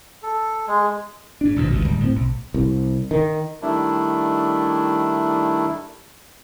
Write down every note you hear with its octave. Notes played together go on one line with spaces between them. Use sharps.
A4
G#3
G#2 D4
A#1 D#2 B2 F3
G#1 C#2 G2
D1 G3
A2 F3 C4
B1
C2
D#3
D#3 G3 A3 D4 E4